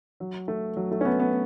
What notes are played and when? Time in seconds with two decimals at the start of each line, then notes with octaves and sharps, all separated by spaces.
0.20 F#3
0.48 A3
0.77 F#3
0.91 A3
1.01 C#4
1.05 B3
1.20 B3